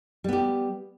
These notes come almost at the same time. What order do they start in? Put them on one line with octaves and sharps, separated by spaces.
G3 B3 G4